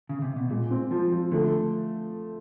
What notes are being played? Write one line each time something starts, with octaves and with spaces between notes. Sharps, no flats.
C#3
C3
B2
A#2 G#3
C4
F3
F3
D3 A3